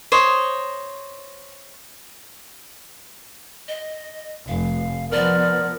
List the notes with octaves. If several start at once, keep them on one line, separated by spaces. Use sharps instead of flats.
C5 C#5 D#5
D#5
F1 F5
F3 B3 A#4 D5